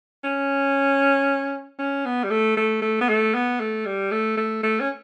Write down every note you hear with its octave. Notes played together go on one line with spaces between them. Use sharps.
C#4
C#4
B3
G3
A3
A3
A3
B3
A3
B3
A3
G3
A3
A3
A3
C#4